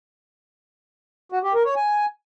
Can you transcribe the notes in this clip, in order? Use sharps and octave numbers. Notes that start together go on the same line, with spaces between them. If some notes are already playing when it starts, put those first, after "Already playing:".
F#4
G4
A#4
C#5
G#5